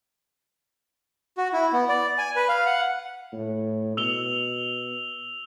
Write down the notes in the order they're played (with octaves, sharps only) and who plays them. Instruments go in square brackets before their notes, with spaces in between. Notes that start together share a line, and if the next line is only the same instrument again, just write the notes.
[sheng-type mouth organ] F#4
E4
B3
D5
G#5
B4
F5
F#5
[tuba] A2
[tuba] B2 [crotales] E6 F7 G7